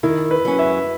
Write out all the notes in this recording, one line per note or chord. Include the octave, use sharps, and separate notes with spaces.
D#3 E4
B4
F#3 C#4
E5